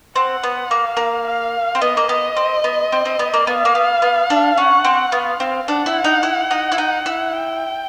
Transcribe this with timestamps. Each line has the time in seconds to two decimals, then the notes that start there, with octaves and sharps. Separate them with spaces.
0.16 C4 F#5
0.43 B3
0.70 A#3 F5
0.97 A#3
1.27 F5
1.75 C4
1.82 B3 D#5
1.97 A#3
2.09 B3
2.37 C4
2.64 B3
2.92 C4
3.05 C4
3.19 B3
3.34 A#3
3.47 B3 F5
3.65 A#3
3.75 B3
4.02 B3
4.30 D4
4.57 C#4 F#5
4.85 C4
5.12 B3 F5
5.40 C4
5.68 D4 F#5
5.86 E4
6.04 D#4
6.23 E4
6.51 D#4
6.72 E4
6.78 D#4
7.06 E4
7.33 G5